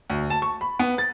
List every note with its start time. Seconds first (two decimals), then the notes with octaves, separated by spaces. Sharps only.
0.10 D2
0.30 A5
0.42 C#6
0.61 B5
0.79 B3
0.98 A6